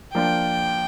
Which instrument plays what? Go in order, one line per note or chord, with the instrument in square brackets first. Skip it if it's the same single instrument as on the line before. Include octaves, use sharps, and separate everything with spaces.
[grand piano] F3 A#3 D4 F4 [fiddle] G5